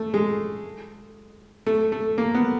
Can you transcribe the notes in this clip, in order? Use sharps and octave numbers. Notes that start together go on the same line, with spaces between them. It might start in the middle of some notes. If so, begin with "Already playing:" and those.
Already playing: A3
G#3
A3
A3
A#3
B3